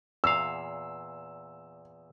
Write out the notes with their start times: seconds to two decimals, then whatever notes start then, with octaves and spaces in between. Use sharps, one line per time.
0.24 E2 A#2 F5 E6